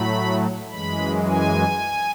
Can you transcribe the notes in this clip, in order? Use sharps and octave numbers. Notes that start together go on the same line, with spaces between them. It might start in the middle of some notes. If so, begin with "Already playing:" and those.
Already playing: A2 F#3 A3 B5
F#2 E3 G#3 B5
G#5